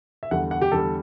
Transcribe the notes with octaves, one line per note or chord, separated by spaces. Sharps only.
E5
E2 D3 G3 F#5
F#5
G4
E2 D3 G3 A4